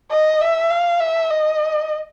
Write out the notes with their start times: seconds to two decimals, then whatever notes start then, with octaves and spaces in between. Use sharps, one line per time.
0.11 D#5
0.41 E5
0.70 F5
1.00 E5
1.30 D#5